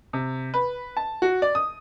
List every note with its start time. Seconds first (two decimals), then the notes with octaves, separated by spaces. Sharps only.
0.13 C3
0.54 B4
0.97 A5
1.22 F#4
1.42 D5
1.55 D#6